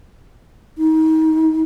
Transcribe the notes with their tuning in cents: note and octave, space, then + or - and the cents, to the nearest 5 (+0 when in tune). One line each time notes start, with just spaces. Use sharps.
D#4 +30